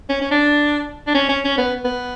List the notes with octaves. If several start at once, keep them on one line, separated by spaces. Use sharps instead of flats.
C#4
C#4
D4
D4
C#4
C#4
C#4
B3
B3